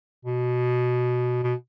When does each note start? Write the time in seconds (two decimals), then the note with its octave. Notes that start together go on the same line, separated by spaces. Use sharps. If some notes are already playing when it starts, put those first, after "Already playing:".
0.25 B2
1.43 B2